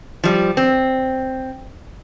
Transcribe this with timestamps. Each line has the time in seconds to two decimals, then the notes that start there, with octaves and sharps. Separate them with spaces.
0.24 F3 G3
0.57 C4